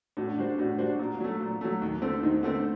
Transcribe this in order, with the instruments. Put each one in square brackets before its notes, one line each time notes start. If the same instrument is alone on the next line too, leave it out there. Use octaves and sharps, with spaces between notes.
[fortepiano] A2 [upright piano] D4 F#4
[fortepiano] G3 D4 F#4 C5
[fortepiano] A2 [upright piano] D4 F#4
[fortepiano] G3 D4 F#4 C5
[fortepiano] A#2 [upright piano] D4 F#4
[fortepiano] F#3 A3
A#2
F#3 A3
D#2
D3 A3 C4
[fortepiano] D#2 [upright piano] C4 D#4
[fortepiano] D3 A3 C4